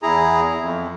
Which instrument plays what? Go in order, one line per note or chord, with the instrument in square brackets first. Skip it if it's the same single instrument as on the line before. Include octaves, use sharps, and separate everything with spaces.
[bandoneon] E2 E4 G#4 A#5
F2